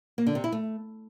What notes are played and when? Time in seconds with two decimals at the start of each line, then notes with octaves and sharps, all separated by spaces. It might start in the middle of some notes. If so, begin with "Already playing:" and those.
0.18 A#3
0.27 D3
0.35 C3
0.44 E4
0.52 A3